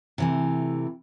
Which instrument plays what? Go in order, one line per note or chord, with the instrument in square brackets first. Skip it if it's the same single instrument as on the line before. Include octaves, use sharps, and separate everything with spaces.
[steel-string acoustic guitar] C3 E3 A3